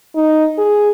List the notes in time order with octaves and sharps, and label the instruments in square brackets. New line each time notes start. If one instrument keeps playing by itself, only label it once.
[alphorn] D#4
G#4